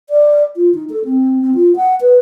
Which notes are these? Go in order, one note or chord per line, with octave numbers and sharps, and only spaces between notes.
D5
F4
D#4
A4
C4
C4
F4
F#5
B4